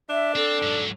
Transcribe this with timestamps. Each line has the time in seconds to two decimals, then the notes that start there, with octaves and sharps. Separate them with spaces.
0.10 D4 E5
0.36 C4 A4
0.63 G#2 F#3